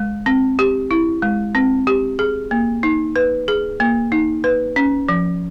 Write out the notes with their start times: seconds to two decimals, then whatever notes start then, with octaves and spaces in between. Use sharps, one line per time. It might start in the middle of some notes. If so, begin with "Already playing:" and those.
Already playing: G#3
0.26 C4
0.59 G4
0.91 E4
1.22 G#3
1.55 C4
1.87 G4
2.19 G#4
2.51 A#3
2.83 D#4
3.16 B4
3.48 G#4
3.80 A#3
4.12 D#4
4.44 B4
4.76 C#4
5.09 F3